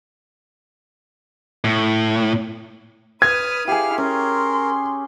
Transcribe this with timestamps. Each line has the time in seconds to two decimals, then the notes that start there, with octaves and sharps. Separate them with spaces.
1.64 A2
3.22 B4 D#6 F6 G#6 D#7
3.68 E4 G4 G#4 F5 F6
3.98 C#4 A#4 C6